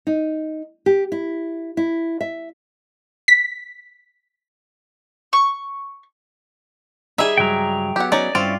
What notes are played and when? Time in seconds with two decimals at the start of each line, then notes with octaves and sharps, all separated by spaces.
0.07 D#4
0.86 G4
1.12 E4
1.77 E4
2.21 E5
3.28 B6
5.33 C#6
7.18 G3 D#4 G#4 E5
7.38 C#2 G2 F#3 G5 A#5
7.96 F#3 B3 G4 F#5
8.12 C#4 D#4 D5 A#5
8.35 G2 C4 C#4 E4 F4 D5